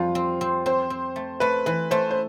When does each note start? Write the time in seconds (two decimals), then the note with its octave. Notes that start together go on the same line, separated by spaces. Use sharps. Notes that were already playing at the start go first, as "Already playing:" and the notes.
Already playing: F2 G3 F4
0.15 C4
0.41 C4
0.66 C4 C5
0.90 C4
1.16 A3
1.40 A3 B4
1.66 E3 B4
1.91 A3 C5
2.11 C5